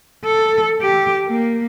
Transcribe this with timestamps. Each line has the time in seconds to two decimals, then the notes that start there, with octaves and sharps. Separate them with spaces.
0.24 A4
0.82 G4
1.27 A#3